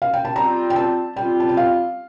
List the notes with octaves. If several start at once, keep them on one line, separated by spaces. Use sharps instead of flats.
F5
G5
A5
G3 C4 F4 A#5
G5
A5
G3 C4 F4 G5
A5
G5
F5